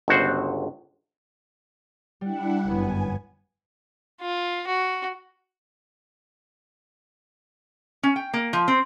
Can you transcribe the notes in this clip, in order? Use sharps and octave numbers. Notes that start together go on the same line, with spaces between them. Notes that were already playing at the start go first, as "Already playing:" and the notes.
G1 C#2 F#4 C5
G3 D4 E4 F#5
G1 F#2 B3 G#5
F4
F#4
C#4
G5
A#3
F3
C4